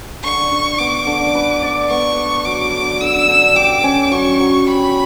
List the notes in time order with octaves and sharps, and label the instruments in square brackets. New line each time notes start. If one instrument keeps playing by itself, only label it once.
[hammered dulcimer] D3 [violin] C#6
[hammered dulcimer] D3
[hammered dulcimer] B3 [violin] D6
[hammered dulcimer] D3
B4
D5
[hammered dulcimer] B3 [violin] C#6
[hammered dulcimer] D5
[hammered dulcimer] F#3 [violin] D6
[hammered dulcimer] D3
[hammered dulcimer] D3 [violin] E6
[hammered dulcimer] D3
[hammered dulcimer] G4 [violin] D6
[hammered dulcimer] C#4
[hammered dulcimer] F#3 [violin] C#6
[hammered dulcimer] F#3
[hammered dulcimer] G4 [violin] B5